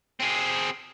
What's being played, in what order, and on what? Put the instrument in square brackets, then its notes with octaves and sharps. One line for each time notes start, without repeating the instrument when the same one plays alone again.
[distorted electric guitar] C4 G#4